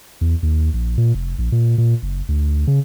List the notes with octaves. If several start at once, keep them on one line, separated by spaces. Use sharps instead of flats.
E2
D#2
A#1
A#2
F1
A#1
A#2
A#2
F#1
D2
C#3